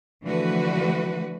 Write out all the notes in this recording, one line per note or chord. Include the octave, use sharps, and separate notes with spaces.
D3 E3 F3 A3 F#4 B4